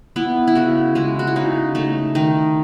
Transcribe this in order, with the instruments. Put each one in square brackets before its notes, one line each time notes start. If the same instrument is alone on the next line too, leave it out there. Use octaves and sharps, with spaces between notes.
[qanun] B3 E4
E4
C#3 F#4
G#3 E4
F#4
E4
C#3 D#4
A3 D#4
D#3 D#4